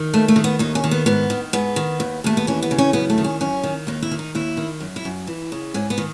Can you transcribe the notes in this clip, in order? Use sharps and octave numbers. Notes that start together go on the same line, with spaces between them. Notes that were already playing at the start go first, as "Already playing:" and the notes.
Already playing: D#3
D#2 A3
A3
D#3
B3
D#2 D#4
C#4
D#3
B3
G#2 B3
D#3
G#2 B3
D#3
D#2
D#2 A3
B3
E3 C#4
B3
C#3
C#4
F#2 B3
A3
D#3
C#4
F#2 C#4
D#3
D#2 D#4
E4
D#3
D#4
D#2 E4
D#3
F#2
E4
F#2
E3
C#3
G#2 C#4
B3
D#3